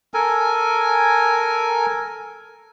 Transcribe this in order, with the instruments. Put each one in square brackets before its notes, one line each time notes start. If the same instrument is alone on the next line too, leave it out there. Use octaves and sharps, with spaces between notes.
[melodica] A4 A#4 G#5